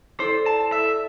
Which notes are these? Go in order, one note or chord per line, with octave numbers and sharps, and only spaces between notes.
E4 A4 C5 D5
A5
E5